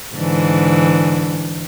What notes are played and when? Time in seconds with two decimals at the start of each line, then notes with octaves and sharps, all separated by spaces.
0.14 G#2 D3 E3